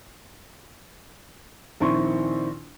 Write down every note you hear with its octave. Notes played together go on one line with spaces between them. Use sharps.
A#1 D#3 C4 E4 C6 C#6